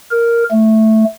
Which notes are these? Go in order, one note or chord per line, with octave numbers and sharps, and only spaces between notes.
A#4
A3